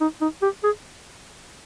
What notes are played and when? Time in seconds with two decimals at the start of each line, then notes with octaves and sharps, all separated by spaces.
0.01 D#4
0.21 D#4
0.42 G4
0.64 G#4